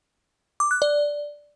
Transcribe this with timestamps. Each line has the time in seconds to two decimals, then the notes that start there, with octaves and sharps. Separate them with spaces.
0.60 D6
0.71 F#6
0.82 D5